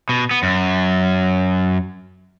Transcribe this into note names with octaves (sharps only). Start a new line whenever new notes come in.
B2
B3
F#2